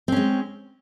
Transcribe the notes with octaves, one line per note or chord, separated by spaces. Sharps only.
G#3 C4 C#4